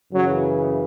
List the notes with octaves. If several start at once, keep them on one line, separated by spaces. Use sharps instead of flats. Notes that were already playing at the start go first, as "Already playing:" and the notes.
F#2 C#3 E3 F#3